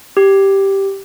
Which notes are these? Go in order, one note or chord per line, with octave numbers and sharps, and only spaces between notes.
G4